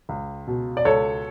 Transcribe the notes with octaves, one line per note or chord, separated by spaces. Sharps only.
C#2
B2
D5
C#2 A4 C#5